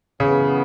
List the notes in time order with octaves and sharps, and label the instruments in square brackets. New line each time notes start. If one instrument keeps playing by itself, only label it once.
[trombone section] F#2 E3 B3 [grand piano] C#3